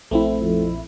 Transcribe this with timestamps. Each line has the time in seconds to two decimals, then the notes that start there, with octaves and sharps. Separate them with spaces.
0.11 A#1 A3 C4 E4
0.41 F2